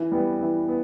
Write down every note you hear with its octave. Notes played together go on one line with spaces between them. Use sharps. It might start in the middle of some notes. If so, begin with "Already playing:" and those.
Already playing: E3
G3 B3
E3
B3